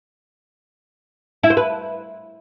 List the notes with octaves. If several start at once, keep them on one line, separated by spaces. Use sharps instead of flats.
E4
C5
B4